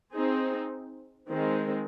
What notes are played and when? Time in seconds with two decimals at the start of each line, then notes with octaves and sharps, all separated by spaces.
0.13 C4 D#4 G#4 C5
1.30 D#3 G#3 C4